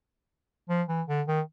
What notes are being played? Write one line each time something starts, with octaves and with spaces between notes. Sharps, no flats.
F3
E3
D3
D#3